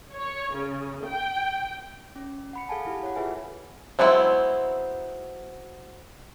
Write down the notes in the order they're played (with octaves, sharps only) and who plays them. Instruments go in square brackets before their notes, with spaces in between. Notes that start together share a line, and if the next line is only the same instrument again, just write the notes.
[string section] C#5
C#3
G5
[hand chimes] C#4
F#5 B5 C#7
G#4 A4 F5 F#5 G#5 A5
E4 G4 B5
C#5 F#5
F4 G#4 A4 B4 E5 G#5
[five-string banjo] F#3 G#3 B3 C4 E4